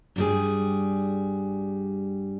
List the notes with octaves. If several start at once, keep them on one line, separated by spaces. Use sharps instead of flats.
G2 G3 G#4